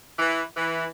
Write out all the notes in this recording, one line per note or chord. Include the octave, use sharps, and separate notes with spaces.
E3
E3